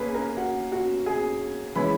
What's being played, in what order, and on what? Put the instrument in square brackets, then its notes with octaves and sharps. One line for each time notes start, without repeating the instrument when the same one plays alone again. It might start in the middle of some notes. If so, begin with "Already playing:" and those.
Already playing: [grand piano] A#3 C#4 [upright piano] G#4 B4 B5
[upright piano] A#4 A#5
F#4 F#5
F#4 F#5
G#4 G#5
[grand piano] E3 G#3 C#4 E4 [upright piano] B4 B5